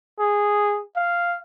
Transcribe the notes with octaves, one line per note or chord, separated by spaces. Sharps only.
G#4
F5